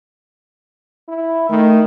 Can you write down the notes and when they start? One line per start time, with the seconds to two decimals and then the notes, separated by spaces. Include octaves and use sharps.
1.08 E4
1.49 D#3 A3